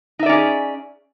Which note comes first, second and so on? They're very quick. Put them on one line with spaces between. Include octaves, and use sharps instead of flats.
D#4 E5 D5 C#4 G#4